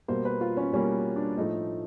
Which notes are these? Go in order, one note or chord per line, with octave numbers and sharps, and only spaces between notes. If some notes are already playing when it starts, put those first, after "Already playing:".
B2 G3 A#3 C5
B4
F4
C#4
B2 G3 A#3 C#4
D4
A2 F3 A3 D#4